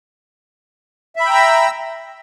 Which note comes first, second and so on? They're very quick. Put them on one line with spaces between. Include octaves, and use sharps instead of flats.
E5 B5 G5 A#5 E6